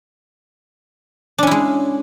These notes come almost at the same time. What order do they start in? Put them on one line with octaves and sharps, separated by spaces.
D4 C#4 E4 G#3